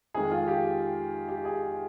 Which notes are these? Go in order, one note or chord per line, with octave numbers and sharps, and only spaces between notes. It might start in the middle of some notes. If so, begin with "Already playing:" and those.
F2 D#3 G#3 G#4
F4
G4
G4
G#4